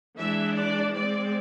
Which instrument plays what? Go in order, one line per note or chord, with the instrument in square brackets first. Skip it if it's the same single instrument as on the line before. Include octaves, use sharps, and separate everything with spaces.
[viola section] E3 G#3 D4 E5
D5
G#3 C4 D5